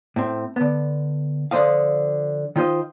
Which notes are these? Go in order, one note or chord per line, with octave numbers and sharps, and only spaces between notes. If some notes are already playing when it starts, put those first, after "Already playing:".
A2 C4
D3 B3
D3 F3 C5 D#5 F5
D#3 F4 C5 D#5